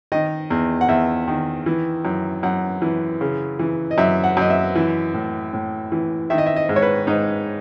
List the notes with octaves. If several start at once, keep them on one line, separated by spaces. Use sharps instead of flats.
D#3 D#5
E2
F#5
E2 E5
D#3
E3
F#2
F#2 F#5
E3
C#3
E3
D#5
F#2 E5
F#5
F#2 D#5
E5
E3
A2
A2
E3
D#3 E5
D#5
E5
D#5
G#2
C#5
B4
G#2 D#4